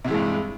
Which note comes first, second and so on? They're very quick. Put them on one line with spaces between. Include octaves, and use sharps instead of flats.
C3 E3 G#3 G2